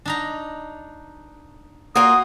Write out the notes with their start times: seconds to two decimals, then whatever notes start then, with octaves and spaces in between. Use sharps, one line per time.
0.05 D4 D#4 A#5
1.96 A#3 F4 F#4 D#6